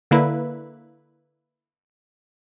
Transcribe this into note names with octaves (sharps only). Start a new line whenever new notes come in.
D3 A#3 E4 B4